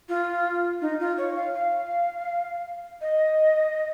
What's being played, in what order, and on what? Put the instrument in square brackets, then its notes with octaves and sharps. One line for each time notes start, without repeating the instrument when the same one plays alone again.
[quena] F4
D#4
F4
C#5
F5
F5
D#5